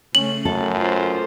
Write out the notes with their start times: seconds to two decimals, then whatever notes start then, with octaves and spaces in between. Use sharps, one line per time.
0.15 C#3 A3 C#4 F#7
0.45 F#2 A4
0.76 F4 C5